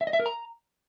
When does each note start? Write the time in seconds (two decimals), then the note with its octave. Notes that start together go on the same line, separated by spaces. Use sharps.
0.01 E5
0.07 D#5
0.13 E5
0.20 A#4
0.26 A#5